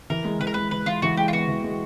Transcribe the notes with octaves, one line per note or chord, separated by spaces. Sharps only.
E3 A#4
G#3
E3 B4
A#4
G#3 B4
E3 B4
E3 F4
E3 F#4
G#3 G4
F4
B3 F#4
E3
G#3